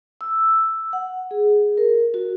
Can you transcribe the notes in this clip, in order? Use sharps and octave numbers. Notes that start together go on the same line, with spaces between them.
E6
F#5
G#4
A#4
F#4